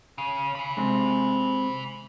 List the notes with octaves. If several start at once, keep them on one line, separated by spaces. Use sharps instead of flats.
C#3
G#5 B5
C3 G#3 C4